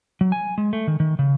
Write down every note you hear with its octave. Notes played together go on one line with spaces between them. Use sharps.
F#3
G#5
G#3
A3
D#3
D#3
C#3